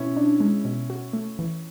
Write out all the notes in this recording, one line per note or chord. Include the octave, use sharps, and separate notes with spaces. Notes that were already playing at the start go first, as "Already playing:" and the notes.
Already playing: B2 C#4 E4
D4
G#3
B2
F#4
A3
E3